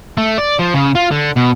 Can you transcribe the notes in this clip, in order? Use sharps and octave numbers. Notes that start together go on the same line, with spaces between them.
A3
D5
F3
C#3
F4
D3
B2